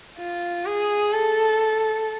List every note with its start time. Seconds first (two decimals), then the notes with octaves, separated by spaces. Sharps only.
0.19 F4
0.66 G#4
1.12 A4